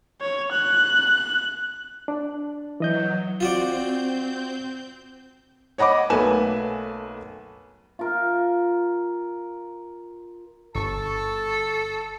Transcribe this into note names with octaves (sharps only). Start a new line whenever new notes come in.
C#5
F#6
D4
E3 F#3 D#5 G6
C4 F4 F#4 D5 G6
C#5 D#5 F#5 B5 D6
B1 A3 A#3 B4 G#5 E7
F4 A#4
G1 A4 A5 C#6